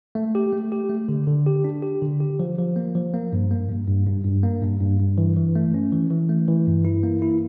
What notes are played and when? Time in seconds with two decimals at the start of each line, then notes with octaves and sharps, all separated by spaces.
0.15 A3
0.35 G4
0.53 A3
0.72 G4
0.90 A3
1.08 D3
1.27 D3
1.47 G4
1.64 D4
1.83 G4
2.02 D3
2.20 G4
2.39 F3
2.58 F3
2.76 A#3
2.95 F3
3.14 A#3
3.32 G2
3.51 A#3
3.70 G2
3.87 G2
4.07 G2
4.24 G2
4.43 A#3
4.62 G2
4.81 G2
5.00 G2
5.18 E3
5.37 E3
5.56 A3
5.74 C#4
5.92 E3
6.10 E3
6.29 A3
6.48 E3
6.67 G2
6.85 E4
7.03 A#3
7.22 E4